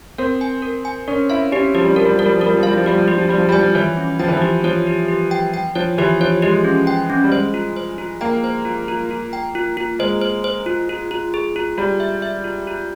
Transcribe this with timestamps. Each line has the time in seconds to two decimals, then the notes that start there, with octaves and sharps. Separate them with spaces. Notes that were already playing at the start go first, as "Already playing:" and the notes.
0.18 C4 A#4
0.41 G#5
0.62 A#4
0.85 G#5
1.08 C#4 A#4
1.30 E4 F5
1.52 C#4 G4
1.74 F3 G4
1.84 G3
1.95 F3 A#4
2.05 G3
2.15 F3 A#4
2.25 G3
2.36 F3
2.41 G3 A#4
2.56 F3
2.63 G3 F5
2.77 F3
2.86 G3 G4
2.98 F3
3.07 G3 G4
3.18 F3
3.29 G3 G4
3.38 F3
3.49 G3 G#5
3.59 F3
3.75 E3 C#5
3.97 C#4
4.19 F3 G5
4.28 E3
4.37 F3 G4
4.64 F3 C#5
4.87 G4
5.08 G4
5.31 G5
5.54 G5
5.75 F3 C#5
5.98 E3 G4
6.20 F3 C#5
6.42 G#3 G4
6.65 C#4
6.87 G5
7.10 C#4
7.24 G3
7.32 G#3 C5
7.54 F4
7.76 C5
7.98 F4
8.21 A#3 G5
8.44 C5
8.65 F4
8.88 F4
9.11 F4
9.33 G5
9.55 F4
9.77 F4
9.99 G#3 C5
10.21 C5
10.44 C5
10.66 F4
10.89 F4
11.11 F4
11.34 G#4
11.56 F4
11.78 G3 F4
12.00 E5
12.22 E5
12.44 F4
12.67 F4